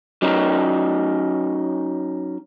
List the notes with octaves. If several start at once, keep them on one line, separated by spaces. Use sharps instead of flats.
F#3 C#4 D#4